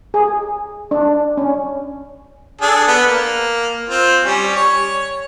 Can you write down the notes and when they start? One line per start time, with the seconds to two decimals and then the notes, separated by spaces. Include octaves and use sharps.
0.14 G#4
0.91 D4
1.37 C#4
2.61 D4 G#4 A4
2.87 B3
3.07 A#3
3.89 C4 F4
4.25 G3 C#4
4.55 C#5